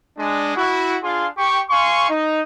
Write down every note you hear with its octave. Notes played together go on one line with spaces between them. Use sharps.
G#3 D4
E4 F#4
D4 F4 G#4 F5 C6
G4 C#6
F5 G#5 C6 C#6
D#4